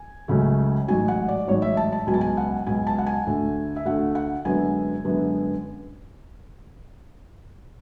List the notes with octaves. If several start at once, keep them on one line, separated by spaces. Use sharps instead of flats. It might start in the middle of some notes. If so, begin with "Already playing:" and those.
Already playing: G#5
C#2 C#3 F#3 A3
A1 G#2 F#3 G#5
F#5
D5
A1 G#2 F#3 C#5
E5
A5
A5
C#2 B2 F#3 G#5
A5
G#5
F#5
C#2 B2 F#3 G#5
A5
F#5
G#5
D2 D3 A3
E5
D2 D3 A3 F#5
F#5
F#2 D3 G#3 B3 G#5
F#2 D3 G#3 B3